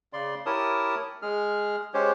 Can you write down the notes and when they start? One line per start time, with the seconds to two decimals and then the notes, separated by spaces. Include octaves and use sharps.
0.13 C#3 D5 C6
0.46 E4 G4 A#4 C#5 A5 D#6
1.22 G#3 G#4 F6
1.94 G#3 C#4 G4 C5 C#5